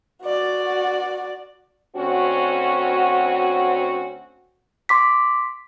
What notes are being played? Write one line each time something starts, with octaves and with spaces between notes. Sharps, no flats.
F#4 D5
D2 C4 C#4 F#4
C6 D6 B6